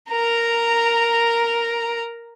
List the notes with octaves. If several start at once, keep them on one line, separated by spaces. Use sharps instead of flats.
A#4 A#5